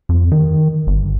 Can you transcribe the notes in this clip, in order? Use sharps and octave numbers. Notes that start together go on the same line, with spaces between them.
F2
D#3
G1